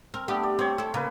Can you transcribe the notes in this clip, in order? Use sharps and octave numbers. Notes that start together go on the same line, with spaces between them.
C4 A#4
A3 B3 D4 G4
D5
C4 C5 C#5
E4 A4
C#3 A#3 B4